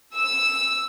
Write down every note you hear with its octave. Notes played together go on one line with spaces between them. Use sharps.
E6